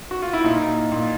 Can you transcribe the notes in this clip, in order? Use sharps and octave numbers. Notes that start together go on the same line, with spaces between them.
F#4
F4
E4
A#2 D#4
A#2